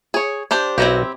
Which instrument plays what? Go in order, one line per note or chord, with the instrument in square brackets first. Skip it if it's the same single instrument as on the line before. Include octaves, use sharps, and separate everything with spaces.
[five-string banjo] G#4 C#5
D4 G4 C5
[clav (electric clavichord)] B1 F#4 D#5 [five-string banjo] C4 E4 G4